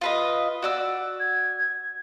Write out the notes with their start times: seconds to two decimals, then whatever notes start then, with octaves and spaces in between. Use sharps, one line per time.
0.01 F4 B4 D#5
0.62 F#4 D5 E6
1.20 G#6